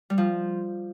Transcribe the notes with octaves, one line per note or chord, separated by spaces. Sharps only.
G3
F3